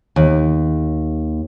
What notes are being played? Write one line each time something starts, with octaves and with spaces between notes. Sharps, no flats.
D#2